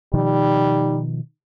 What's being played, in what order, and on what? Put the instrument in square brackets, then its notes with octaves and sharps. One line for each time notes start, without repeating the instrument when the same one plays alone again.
[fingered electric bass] B2 D#3 F3 [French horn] G3 [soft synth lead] D#4